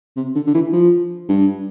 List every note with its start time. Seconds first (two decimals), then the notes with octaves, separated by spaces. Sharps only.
0.16 C3
0.35 D3
0.47 D3
0.54 E3
0.73 F3
1.29 G2